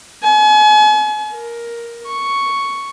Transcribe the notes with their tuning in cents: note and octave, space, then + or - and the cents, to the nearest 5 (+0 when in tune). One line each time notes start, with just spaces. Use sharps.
G#5 +40
A#4 +10
C#6 +5